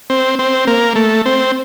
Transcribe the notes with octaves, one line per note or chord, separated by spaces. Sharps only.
C4
C4
A#3
A3
C4